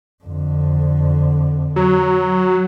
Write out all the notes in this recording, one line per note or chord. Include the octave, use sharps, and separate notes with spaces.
F2 D3
F#3